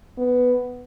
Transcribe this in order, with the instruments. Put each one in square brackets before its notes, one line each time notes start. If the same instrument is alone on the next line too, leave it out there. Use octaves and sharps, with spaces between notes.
[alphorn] B3